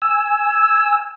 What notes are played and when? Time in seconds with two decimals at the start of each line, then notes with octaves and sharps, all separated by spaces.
0.02 G#5 E6